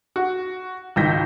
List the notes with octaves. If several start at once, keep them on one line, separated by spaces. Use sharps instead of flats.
F#4
G#1 C#2 D#3 G6 A#6 B6